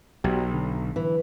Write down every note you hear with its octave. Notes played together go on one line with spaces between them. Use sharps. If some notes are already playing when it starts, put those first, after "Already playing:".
B1 F#4 G4
D3
E3